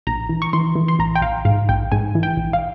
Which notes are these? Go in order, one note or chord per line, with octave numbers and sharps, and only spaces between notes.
A#1 A#5
E3
C#6
E3 C6
E3
C6
A#1 A#5
G5
A#1 F5
G#2 F5
A#1 G5
G#2 G#5
E3
G5
A#1
F5